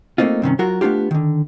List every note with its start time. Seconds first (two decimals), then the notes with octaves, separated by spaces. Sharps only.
0.18 A3 A#3 C4 D#4 F4
0.42 G2 C3 D#3 C#4
0.59 F#3 F4 F#4 A#4
0.81 A3 B3 D4 F4 G4
1.11 D3 D#3